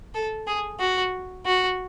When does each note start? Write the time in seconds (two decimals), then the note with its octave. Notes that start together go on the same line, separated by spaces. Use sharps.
0.15 A4
0.47 G#4
0.80 F#4
1.46 F#4